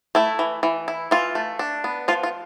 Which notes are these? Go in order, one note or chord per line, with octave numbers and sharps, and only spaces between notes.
A3 E4
E3
E3
E4
E3 F4
A3
D4
B3
F3 F4
F4